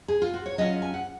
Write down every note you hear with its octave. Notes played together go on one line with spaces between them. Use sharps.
G#4
F4
F#4
C#5
F#3 C#4 F4 D#5
G#5
F#5